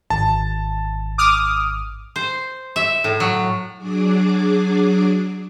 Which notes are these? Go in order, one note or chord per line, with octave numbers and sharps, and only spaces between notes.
G#1 A5
D6 D#6 F6
C5
E5
A2
F#3
F#3 D4 G#4 D6